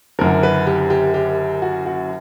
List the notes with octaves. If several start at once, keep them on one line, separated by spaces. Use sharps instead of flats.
F#1 F#2 D3 A#4
B4
G4
G4
G4
F#4
F#4